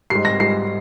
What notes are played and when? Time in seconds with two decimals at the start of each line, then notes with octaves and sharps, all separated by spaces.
0.10 G#2 G3 C7
0.25 A#6
0.40 G#2 G3 C7